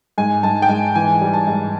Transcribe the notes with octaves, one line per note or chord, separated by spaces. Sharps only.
G#2 G#5
G#2 A5
G5
G#2 G#5
E3 G#5
G3
A5
G#2